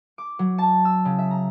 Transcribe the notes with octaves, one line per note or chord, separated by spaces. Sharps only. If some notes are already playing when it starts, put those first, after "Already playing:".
D6
F#3
A5
E6
C#3
E5
A#5